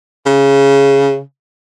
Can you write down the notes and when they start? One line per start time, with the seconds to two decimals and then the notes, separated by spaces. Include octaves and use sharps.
0.26 C#3